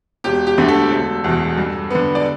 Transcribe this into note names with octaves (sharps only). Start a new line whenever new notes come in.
E1 G4
G4
D2 D3 A3
A4
E1
E2 B2
G2
D3 B3
D5